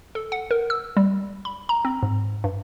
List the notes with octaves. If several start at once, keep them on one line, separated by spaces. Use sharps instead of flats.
A4
F#5
A#4
E6
G3
B5
A#5
C4
G#2
G2